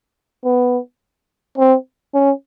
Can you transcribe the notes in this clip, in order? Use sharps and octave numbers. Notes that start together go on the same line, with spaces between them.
B3
C4
C#4